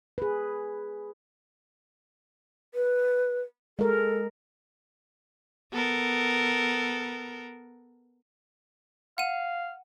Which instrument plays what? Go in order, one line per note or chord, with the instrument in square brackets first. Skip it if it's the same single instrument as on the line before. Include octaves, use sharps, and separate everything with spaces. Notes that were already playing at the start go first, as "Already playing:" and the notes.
[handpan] G#4 B4
[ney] B4
[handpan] G#3 A#4 [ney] A4
[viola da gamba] B3 A4 A#4
[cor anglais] F5 [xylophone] F#5 D#7